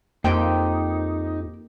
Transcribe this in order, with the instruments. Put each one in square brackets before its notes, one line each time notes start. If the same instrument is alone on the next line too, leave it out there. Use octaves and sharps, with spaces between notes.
[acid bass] F2 [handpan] A#3 [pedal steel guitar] D#4 [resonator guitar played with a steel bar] G4 C5 G5